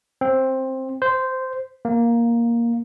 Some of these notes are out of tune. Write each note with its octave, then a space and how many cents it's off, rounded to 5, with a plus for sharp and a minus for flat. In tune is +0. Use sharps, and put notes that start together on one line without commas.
C4 +10
C5 -10
A#3 +5